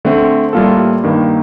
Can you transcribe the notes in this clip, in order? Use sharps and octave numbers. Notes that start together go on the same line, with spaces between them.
D3 A3 C4
A2 G3 A#3 F4 A4
G2 D#3 A#3